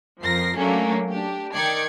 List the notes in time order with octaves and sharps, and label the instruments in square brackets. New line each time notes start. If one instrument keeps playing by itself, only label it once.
[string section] F2 F3 A#4 A#6 C7
F#3 A3 A#3 C#4 D4
D4 G4
D#3 D5 G5 G#6 C7 C#7